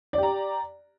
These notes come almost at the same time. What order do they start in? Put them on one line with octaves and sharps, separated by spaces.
D5 G4 A#5